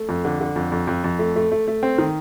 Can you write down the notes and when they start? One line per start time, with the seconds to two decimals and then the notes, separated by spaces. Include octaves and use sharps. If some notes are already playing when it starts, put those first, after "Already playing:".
Already playing: A3
0.09 F2
0.25 D3
0.41 D3
0.56 F2
0.72 F2
0.87 F2
1.04 F2
1.19 A3
1.36 A3
1.52 A3
1.68 A3
1.83 C4
1.98 D#3